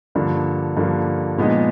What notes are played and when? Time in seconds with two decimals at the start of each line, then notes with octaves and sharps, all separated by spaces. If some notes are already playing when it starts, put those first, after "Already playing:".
0.15 G2 D3 F3 A#3
0.77 G2 D3 F3 A#3
1.38 A#2 F3 G#3 B3 D#4